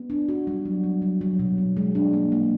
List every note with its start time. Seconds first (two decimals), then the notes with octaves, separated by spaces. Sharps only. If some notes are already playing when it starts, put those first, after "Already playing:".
Already playing: B3
0.10 D4
0.28 F#4
0.47 G3
0.65 F#3
0.84 F#3
1.02 F#3
1.21 F#3
1.39 B2
1.58 B2
1.77 G#3
1.95 D4
2.13 A#3
2.32 A#3